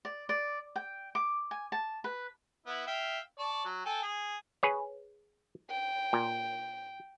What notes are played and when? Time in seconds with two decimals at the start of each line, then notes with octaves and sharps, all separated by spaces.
0.05 D5
0.29 D5
0.76 G5
1.15 D6
1.51 G#5
1.72 A5
2.04 B4
2.66 B3 E4
2.87 E5 F5 G5
3.39 D5 A5 C#6
3.65 F#3
3.85 A4 G5 G#5
4.03 G#4
4.63 G#4 B4 C#5
5.70 G5
6.13 A#2